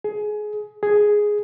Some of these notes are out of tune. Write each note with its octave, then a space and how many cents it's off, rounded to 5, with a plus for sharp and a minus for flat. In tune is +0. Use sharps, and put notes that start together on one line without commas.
G#4 +20
G#4 +0